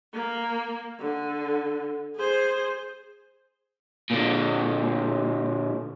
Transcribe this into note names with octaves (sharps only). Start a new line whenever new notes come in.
A#3
D3
G#4 C5
A#2 D3